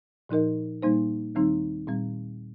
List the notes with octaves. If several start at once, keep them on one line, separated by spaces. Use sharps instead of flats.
A#2 F3 D#4 A#4 D#5
A#2 G3 A#3 D#4 C5
D#2 D#3 G3 C4 D#4
A#2 G3 C4